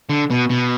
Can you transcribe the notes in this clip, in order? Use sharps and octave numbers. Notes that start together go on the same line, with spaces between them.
D3
B2
B2